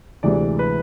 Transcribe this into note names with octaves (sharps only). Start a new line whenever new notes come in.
D2 C3 E3 G#3 D5
B4